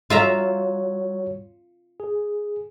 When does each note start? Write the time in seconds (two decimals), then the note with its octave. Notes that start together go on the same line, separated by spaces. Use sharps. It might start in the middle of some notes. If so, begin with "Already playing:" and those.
0.10 G3 F4 F#4 C#5 E5 A#5
2.00 G#4